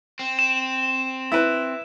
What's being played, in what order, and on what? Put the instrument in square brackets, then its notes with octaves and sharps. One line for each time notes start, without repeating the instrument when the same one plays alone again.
[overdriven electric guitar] C4
[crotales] E7
[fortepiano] E4 B4